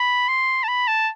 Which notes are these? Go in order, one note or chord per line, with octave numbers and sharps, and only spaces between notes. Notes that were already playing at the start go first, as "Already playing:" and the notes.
Already playing: B5
C6
A5
B5
A5